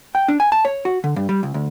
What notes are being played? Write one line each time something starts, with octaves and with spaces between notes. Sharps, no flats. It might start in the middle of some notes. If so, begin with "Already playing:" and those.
G5
D4
G#5
A5
C#5
F#4
D3
G2
G3
C#2
D2